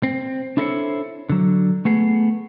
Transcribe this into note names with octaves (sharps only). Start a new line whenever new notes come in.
C4
D4 E4 A4 A#4 C5 C#5
D3 F#3
A3 B3 G#4